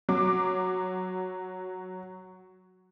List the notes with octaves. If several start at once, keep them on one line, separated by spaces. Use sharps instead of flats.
F#3 D6